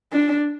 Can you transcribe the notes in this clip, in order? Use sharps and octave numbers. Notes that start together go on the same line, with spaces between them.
D4